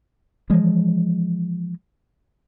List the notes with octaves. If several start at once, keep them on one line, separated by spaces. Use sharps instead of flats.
E3 F3 G#3